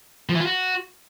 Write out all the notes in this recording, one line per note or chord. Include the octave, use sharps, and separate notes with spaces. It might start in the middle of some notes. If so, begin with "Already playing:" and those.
F3
E3
F4
F#4